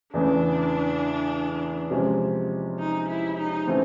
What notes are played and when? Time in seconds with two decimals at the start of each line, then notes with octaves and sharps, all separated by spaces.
0.14 E2 C#3 E3 A3 C#4 D4
1.91 C3 F3 G#3 C#4
2.79 D#4
3.09 E4
3.38 D#4
3.67 C#3 E3 A3 C4